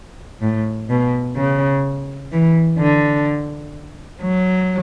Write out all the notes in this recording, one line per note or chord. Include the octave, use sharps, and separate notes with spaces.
A2
B2
C#3
E3
D3
F#3